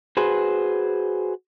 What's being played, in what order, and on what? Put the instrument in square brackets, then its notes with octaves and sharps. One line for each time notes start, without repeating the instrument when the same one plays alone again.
[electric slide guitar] F#4 G#4 B4 C5